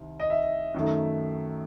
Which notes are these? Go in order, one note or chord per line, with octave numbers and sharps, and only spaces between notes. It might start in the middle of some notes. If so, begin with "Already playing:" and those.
Already playing: C2 C3 D#3
D#5
E5
F#2 D#3 A3